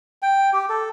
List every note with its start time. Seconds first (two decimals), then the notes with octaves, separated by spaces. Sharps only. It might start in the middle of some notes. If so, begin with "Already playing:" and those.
0.22 G5
0.53 G4
0.69 A4